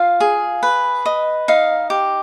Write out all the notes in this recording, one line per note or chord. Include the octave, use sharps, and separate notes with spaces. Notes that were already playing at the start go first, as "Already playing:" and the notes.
Already playing: F4 F5
G#4
B4
D#5
D#4 F5
G4